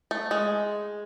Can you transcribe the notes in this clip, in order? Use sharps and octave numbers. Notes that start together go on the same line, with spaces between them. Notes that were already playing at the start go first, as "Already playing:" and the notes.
A3
G#3